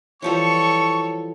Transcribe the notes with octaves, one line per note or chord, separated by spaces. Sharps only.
E3 F3 G3 A4 C#5 C#6